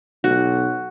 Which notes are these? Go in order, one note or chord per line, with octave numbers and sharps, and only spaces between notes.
B1 F#4